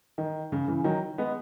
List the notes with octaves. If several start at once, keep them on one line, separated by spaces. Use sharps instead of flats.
D#3
C#3
C#3 E3
D#3 F#3
G#3 B3